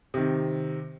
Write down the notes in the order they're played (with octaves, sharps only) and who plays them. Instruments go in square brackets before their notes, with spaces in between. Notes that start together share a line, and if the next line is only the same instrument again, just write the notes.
[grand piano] C3 D#3